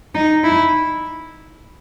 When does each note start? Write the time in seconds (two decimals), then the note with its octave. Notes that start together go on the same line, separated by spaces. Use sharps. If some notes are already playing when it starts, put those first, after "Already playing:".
0.15 D#4
0.44 E4